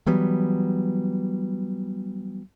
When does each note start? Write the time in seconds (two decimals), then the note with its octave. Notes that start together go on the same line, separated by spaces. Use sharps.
0.06 E3 F#3 G3 B3